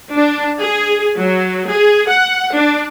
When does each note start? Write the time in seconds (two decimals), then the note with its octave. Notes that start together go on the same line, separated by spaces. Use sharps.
0.16 D4
0.61 G#4
1.17 F#3
1.70 G#4
2.09 F#5
2.57 D4